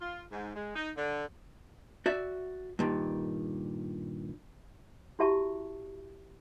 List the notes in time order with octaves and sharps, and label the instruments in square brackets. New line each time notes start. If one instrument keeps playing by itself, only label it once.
[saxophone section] F4
G#2
G#3
D#4
D3
[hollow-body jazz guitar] F#4 D5 E5
G2 A#2 D#3
[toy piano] E4 F#4 G4 E5 A5 C#6